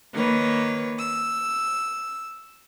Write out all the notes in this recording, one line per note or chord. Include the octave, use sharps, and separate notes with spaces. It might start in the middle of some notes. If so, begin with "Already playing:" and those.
D#3 A#3 B4 C#5
E6